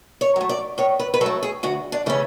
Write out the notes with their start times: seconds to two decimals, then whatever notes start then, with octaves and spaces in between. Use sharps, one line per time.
0.21 C#5
0.36 F#3 A3
0.49 D5
0.78 A2 C#5
0.99 B4
1.14 B4
1.21 F#3 A4
1.26 A3
1.43 G#4
1.63 D2 F#4
1.92 D4
2.06 C#3 E3 A3 C#4